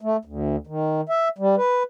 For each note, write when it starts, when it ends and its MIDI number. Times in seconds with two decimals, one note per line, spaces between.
0.01 0.17 57
0.25 0.56 38
0.67 1.01 51
1.09 1.28 76
1.38 1.55 55
1.57 1.83 71